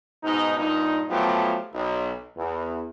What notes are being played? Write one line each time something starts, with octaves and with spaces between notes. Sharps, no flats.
G#2 B2 D#4
G2 A#2 D#4
F3 F#3 A3 B3 G4
B1
E2